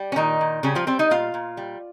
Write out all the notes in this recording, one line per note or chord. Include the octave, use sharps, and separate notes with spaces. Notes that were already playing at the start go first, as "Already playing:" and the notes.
Already playing: G3
C#4
A#2 D#3 D#4
A#2
C#3 G3 C#4
F3 F4
G3 C4 C5
D#4 D#5
A#2 F4 F5
A#2
G3